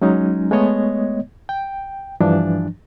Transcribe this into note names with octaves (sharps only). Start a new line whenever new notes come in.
F#3 G#3 C#4 D#4
G#3 A3 B3 C#5 D#5
G5
G2 E3 F3 D4